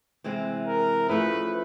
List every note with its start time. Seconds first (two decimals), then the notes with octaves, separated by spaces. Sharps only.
0.24 C3 E3 G#3 C4
0.67 A#4
1.09 F3 A3 C#4 E4 G#4 B4